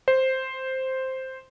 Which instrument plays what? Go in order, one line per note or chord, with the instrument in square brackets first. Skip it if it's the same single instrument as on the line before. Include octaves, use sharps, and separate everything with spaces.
[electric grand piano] C5